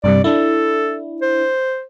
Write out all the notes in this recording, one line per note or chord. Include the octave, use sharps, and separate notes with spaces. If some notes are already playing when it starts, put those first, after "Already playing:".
G2 C3 G3 D5
D4 E4 A4
C5